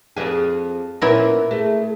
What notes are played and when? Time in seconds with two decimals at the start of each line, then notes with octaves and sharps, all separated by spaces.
0.17 F2 G#4
1.02 A#2 B3 C#4 E4 A#4 B4
1.51 A3 G#4